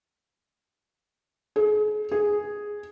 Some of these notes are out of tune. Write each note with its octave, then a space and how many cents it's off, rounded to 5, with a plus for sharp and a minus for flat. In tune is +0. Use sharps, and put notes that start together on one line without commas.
G#4 +35
G#4 +0